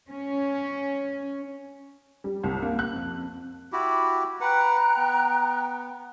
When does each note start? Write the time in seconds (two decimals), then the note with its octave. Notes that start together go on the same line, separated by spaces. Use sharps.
0.10 C#4
2.24 G3
2.44 C2
2.62 A#3
2.79 F#6
2.93 F2
3.73 E4 F#4 G4
4.41 B4 F#5 G5 A#5 F#6
4.97 B3